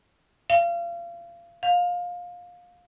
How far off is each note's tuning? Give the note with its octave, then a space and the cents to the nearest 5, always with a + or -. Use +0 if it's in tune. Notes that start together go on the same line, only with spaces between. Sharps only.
F5 -30
F5 +20